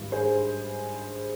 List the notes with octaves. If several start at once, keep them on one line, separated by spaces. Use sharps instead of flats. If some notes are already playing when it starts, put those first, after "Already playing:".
Already playing: G#1 G2 D#3 G3
G#4 C5